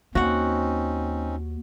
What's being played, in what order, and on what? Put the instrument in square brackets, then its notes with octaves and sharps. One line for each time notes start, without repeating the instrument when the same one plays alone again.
[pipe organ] D#2 [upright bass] A#3 [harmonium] C4 C#4 D#4 [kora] F#4 F#5